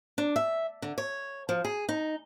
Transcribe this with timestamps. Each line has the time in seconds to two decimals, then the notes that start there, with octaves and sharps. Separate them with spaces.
0.18 D4
0.36 E5
0.82 D3
0.98 C#5
1.49 F3
1.65 G#4
1.89 D#4